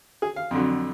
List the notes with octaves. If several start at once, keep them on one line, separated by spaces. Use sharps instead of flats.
G#4
F5
F2 D3 F#3